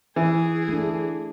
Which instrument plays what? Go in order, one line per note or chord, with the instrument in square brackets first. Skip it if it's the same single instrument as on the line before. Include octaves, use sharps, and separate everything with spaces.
[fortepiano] E3 [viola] G#4
[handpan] A3 D4